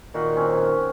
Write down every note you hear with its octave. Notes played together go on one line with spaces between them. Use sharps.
A#2 D#3 F#4 F#5
C4 C#4